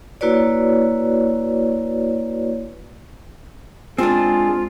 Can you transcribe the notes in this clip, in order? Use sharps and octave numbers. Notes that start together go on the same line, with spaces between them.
A#3 E4 F#4 B4 C#5 D5
G#3 C4 D4 F4 G#4